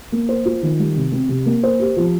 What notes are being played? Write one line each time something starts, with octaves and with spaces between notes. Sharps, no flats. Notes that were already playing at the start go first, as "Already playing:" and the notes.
A#3
C5
F4
D#3
G3
C3
C4
C3
A#3
C5
G4
F3